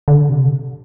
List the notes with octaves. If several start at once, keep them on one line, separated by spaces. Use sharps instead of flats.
D3
C3